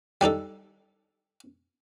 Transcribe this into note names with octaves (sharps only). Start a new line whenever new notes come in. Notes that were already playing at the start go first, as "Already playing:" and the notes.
G3 D4 D#4 A4